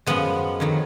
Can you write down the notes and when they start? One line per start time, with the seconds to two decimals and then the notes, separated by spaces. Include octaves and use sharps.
0.06 F#2 F3 G#3 B3
0.60 F2 D#3 F#3